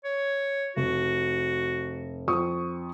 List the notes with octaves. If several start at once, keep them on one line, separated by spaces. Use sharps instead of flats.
C#5
F1 F#4
F2 C#6 D#6